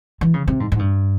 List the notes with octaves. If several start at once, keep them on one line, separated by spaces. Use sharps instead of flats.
E3
C#3
C3
G#2
G#2
G2